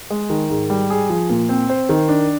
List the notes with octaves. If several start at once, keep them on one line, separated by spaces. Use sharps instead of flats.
G#3
D#3
G#2
G3
G#4
F3
A#2
C4
C5
D#3
D4